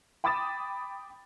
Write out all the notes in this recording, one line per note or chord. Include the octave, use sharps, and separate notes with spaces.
G5 B5 D6 D#6 A6 E7